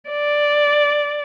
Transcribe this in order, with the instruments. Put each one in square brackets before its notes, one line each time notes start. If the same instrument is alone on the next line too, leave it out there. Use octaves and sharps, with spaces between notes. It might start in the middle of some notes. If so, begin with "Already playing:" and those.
[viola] D5